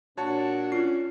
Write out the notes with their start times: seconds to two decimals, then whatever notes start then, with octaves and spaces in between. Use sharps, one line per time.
0.17 A#2 D4 F#4 C#5 A5
0.72 C#4 F4 C7